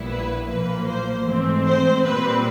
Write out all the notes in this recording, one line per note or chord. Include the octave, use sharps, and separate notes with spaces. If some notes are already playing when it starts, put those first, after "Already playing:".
Already playing: A#1 A#2 G3 B3 E4
B4
B1 A#2 F3 A#3 B4
C5
G#2 E3 A3 C4
C5
A#2 G3 C4 B4